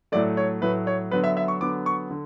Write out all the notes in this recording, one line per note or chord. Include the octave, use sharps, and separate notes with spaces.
A2 F#3 A3 D5
C#5
A2 F#3 A3 B4
C#5
D3 F#3 B3 B4
E5
E5
C#6
D3 F#3 B3 D6
C#6
D3